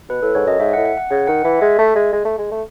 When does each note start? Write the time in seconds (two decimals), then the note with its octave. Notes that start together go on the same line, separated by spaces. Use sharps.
0.09 B2 B4
0.22 A2 A4
0.35 G#2 C#5
0.47 F#2 D#5
0.60 G#2 E5
0.73 F#5
0.77 A2
0.86 F#5
0.98 F#5
1.10 C#3 F#5
1.27 D#3 F#5
1.44 E3 E5
1.61 G#3 E5
1.79 A3
1.96 G#3
2.13 G#3
2.25 A3
2.38 G#3
2.51 A3